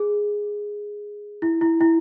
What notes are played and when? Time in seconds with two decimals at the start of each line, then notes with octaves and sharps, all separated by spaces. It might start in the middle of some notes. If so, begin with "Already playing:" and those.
Already playing: G#4
1.42 E4
1.61 E4
1.81 E4